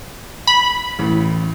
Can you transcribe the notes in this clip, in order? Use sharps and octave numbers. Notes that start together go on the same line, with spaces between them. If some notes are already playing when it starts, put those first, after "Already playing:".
B5
A1